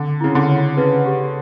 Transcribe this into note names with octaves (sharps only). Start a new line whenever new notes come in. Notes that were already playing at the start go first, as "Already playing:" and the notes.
Already playing: D3
C#3 E4
D3
C#5
C#3 B4
G4